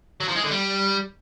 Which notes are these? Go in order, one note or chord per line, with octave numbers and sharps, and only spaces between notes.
F#3
F3
G#3
D3
G3